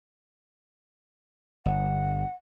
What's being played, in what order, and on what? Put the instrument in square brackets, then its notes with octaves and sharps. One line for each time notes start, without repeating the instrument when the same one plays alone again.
[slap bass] G1 [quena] F#5